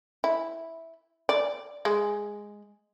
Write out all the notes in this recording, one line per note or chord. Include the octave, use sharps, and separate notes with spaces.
E4
D5
G#3